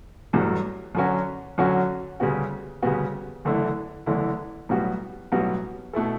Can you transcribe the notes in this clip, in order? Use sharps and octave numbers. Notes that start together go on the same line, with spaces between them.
A1 G2 F#3 A3
F#2 D3 F#3 C#4 F#4
F#2 D3 F#3 C#4 F#4
D2 C#3 G3 B3 F#4
D2 C#3 G3 B3 F#4
F#1 E2 D3 A3 E4
F#1 E2 D3 A3 E4
B1 A2 G3 B3 F#4
B1 A2 G3 B3 F#4
B2 A3 E4 A4